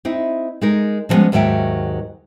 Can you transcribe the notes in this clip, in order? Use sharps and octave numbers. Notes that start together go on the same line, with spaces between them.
C4 D#4 E4
G#3 D#4 A#4
D3 F3 G3 G#3 B3 C#4
D#2 G#2 D#3 F#3 E5 G5